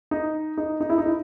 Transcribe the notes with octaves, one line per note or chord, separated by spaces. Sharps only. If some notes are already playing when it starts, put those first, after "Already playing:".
D#4
D#4
D#4
E4
D#4
E4